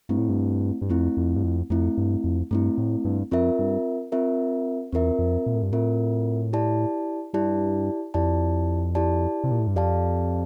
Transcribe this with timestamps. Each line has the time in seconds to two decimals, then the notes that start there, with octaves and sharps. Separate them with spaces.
0.09 G2 A3 C4 E4
0.18 A2
0.29 G2
0.81 G2
0.90 F2 A3 C4 E4
1.17 F2
1.36 G2
1.44 F2
1.70 F2 A3 C4 E4
1.97 G2
2.24 F2
2.51 G2 A3 C4 E4
2.78 A2
3.05 G2
3.31 F2 C4 F4 A#4 E5
3.59 G2
4.12 C4 F4 A#4 E5
4.92 E2 C4 F4 A#4 E5
5.19 F2
5.46 A#2
5.54 A2
5.63 G2
5.72 A2 C4 F4 A#4 E5
6.53 E4 G4 D5 A5
7.33 G2 E4 G4 D5 A5
8.14 F2 E4 G4 D5 A5
8.95 E4 G4 D5 A5
9.44 C3
9.51 A#2
9.60 A2
9.67 G2
9.75 F2 G4 D5 F5 A5